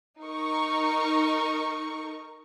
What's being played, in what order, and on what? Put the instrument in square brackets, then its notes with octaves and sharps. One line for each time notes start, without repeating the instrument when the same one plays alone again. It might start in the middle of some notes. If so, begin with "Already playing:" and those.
[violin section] D#4 A#4 C#6